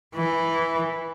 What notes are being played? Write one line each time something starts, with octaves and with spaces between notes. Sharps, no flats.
E3